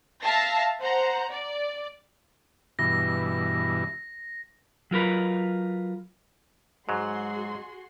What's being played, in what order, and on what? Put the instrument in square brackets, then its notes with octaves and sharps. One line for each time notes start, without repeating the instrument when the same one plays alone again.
[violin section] E5 F5 A5 A#6 C7
C5 F#5 A#5
D5
[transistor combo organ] G2 B2 E3 [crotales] A#6
[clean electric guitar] F#3 F4 A#4 B4
[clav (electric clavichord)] G#2 F#3 [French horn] G#3 [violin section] F#4 G#4 C6